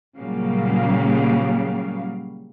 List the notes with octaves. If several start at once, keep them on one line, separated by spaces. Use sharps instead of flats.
A#2 C#3 F#3 G3 A#3 F5